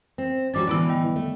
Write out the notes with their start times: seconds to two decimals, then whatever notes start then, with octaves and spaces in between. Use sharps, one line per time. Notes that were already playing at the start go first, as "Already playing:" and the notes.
0.18 C4
0.54 F#3 G3 C#4 D6 A6
0.67 A2 D3 E3 B3 E4
0.89 D#3 G3
1.16 A3